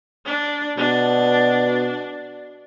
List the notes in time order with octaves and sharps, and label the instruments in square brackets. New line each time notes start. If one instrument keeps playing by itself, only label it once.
[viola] D4
[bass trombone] B2 [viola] D4